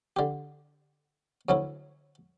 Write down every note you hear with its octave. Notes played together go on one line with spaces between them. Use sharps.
D3 G4
D2 F#3 C#4 E4